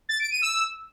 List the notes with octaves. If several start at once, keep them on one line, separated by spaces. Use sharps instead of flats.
A6
D7
D#7
E6